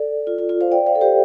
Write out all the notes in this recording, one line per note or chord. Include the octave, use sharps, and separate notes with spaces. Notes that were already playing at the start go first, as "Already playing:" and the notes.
Already playing: A4 D5
F4
F4
F4
C5 F5
D5 G5
C5 F5
A4
G4 C5